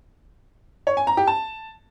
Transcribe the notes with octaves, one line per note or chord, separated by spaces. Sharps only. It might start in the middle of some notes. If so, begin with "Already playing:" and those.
C#5
G#5
A#5
G4
A5